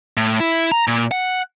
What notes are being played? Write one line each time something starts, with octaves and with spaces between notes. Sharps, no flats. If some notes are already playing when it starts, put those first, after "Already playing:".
A2
E4
A#5
A#2
F#5